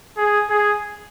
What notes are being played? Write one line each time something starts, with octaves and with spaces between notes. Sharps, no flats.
G#4
G#4